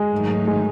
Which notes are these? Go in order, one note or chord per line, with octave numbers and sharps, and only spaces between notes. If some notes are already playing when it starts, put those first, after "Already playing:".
Already playing: G#3
G#2 D#3 F#3 A3 D#4
G#3